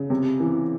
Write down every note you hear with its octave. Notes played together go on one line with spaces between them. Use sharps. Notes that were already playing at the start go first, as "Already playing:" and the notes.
Already playing: C#3
C3
E3